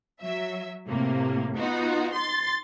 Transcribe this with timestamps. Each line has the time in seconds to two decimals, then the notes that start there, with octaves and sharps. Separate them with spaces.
0.21 F#3 E5
0.87 A2 C3 A#3
1.56 B3 D#4 F4 F#4
2.14 C6 A6